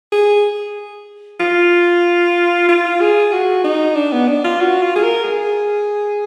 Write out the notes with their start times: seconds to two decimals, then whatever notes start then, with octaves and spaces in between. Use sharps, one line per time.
0.12 G#4
1.40 F4
2.69 F4
3.00 G#4
3.32 F#4
3.64 D#4
3.96 D4
4.12 B3
4.28 D4
4.44 F4
4.61 F#4
4.82 F4
4.96 G#4
5.03 A#4
5.24 G#4